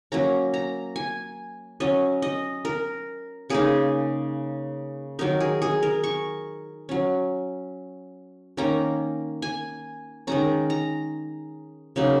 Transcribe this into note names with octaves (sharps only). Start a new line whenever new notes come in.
F#3 A#3 C#4 A#5
A#5
G#5
F#3 C#4 D#5
D#5
A#4
C#3 A#3 D#4 G#4
D#3 F#3 D#4 A#4
G#4
G#4
A#4
C#6
F#3 C#4
D#3 A#3 C#4 A#5
G#5
D#3 G#3 C#4 A#5
A#5
C#3 F#3 A#3 D#4